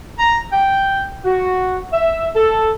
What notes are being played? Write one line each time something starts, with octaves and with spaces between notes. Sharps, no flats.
A#5
G5
F#4
E5
A4